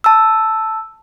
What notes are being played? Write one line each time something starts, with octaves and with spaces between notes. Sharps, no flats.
A5 E6